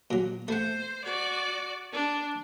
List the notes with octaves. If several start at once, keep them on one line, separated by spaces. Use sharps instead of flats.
A#2 F#3
A3 C5 F#5
F#4 D5
D4